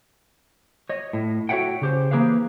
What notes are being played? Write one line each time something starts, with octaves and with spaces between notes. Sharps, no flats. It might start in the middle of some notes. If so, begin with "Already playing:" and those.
C#5 D#5
A2
F#4 A4 C#5 E5 F#5 G5
C#3 G4 C5
E3 A#3 G#4 B4 C5 F5